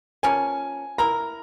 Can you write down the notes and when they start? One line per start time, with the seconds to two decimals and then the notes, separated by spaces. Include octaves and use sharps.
0.23 F3 A#3 C#4 G#5
0.98 A#3 E4 A#4 A#5